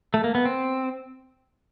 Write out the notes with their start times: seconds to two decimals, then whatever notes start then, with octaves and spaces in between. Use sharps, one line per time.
0.14 A3
0.24 A#3
0.35 B3
0.45 C4